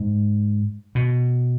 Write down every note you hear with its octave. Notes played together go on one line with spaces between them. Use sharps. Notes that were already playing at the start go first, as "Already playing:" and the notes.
Already playing: G#2
B2